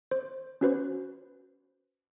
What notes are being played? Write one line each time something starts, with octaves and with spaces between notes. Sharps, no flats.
C5
C#4 F#4 B4 C5